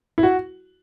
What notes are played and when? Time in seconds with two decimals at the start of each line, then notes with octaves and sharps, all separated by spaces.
0.18 E4
0.23 F#4